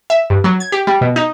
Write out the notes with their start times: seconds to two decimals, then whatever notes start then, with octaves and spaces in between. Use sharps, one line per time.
0.10 E5
0.30 G2
0.44 F#3
0.60 G#6
0.72 G4
0.87 G3
1.01 B2
1.16 D#4